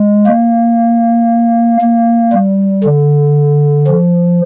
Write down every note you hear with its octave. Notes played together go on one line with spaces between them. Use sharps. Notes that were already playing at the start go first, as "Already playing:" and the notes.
Already playing: G#3
A#3
A#3
G3
D3
F3